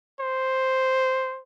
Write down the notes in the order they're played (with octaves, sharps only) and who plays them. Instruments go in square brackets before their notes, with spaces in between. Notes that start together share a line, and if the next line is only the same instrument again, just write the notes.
[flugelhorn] C5